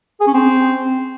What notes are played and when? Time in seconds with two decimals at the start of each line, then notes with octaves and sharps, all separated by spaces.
0.20 G#4
0.27 C#4
0.34 C4